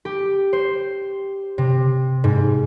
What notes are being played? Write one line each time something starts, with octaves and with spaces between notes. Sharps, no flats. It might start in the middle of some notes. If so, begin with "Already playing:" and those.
G4
C5
C3
G#2